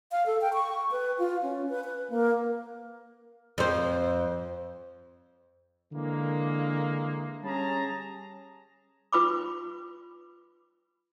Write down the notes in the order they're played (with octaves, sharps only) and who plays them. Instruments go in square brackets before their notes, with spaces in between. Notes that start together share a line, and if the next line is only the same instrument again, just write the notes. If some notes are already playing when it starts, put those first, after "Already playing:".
[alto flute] F5
A4
G5
C#6
B4
F4
C#4
B4
B4
A#3
[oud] F2 C5
[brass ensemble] D3 E3 G#3 A#3
G3 C#4 G#4 A5 A#5
[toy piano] F4 B4 B5 D6